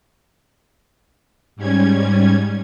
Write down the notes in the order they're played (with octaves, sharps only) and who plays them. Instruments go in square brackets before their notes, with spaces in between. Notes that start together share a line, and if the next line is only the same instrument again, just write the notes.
[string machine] G#2 G3 C#4 G#6